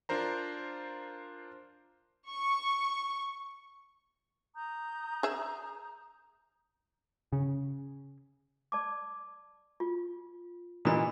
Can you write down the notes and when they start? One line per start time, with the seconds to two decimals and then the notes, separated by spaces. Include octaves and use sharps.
0.09 D4 F4 A#4 C5 A#5
2.29 C#6
4.55 A#5 D#6 G6
5.23 G#4 E5
7.33 C#3
8.72 D5 A5 D6
9.80 F4
10.85 A#2 E3 D#5 B5 D#6